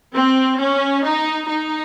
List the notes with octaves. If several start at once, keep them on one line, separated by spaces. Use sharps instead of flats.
C4
C#4
D#4
D#4